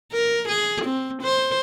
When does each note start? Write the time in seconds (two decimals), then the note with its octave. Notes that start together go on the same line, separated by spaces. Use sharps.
0.12 A#4
0.48 G#4
0.84 C4
1.22 C5